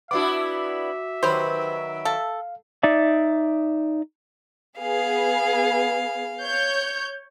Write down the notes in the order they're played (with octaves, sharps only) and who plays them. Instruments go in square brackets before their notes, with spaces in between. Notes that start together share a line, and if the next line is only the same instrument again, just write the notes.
[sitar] B3 D4 E4 [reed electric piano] F#4 D6 [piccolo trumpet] E5
[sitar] D#3 F#3 B4 [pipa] G4 C5
[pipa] A4 [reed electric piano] F5
[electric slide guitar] D#4 D5 E5
[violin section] B3 G#4 [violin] F5
[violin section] C#5 G6